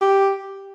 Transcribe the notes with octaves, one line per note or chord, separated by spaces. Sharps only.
G4